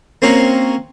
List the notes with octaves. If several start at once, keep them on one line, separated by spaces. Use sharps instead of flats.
A#3 C4 C#4 F#4 A#4